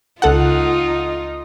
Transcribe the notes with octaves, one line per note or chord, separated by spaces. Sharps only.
C#2 D#4 F4 A4 F#5